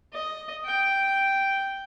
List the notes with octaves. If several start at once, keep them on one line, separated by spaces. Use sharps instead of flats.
D#5
G5